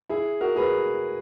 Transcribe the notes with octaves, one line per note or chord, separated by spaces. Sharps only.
E4 G#4
F#4 A#4
G#4 B4